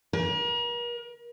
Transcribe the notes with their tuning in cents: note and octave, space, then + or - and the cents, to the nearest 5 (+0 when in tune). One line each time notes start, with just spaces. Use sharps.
A#4 +40